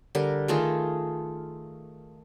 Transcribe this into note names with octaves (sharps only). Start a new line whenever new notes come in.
D3 G3 A#4
D#3 A3 F4 G#4